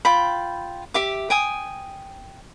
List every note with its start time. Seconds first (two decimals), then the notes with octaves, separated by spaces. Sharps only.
0.05 F4 G5 B5
0.94 G4 E5 D6
1.30 G5 G#5 D#6